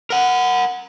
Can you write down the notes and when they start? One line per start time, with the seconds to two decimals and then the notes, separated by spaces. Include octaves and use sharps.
0.10 A#4 F#5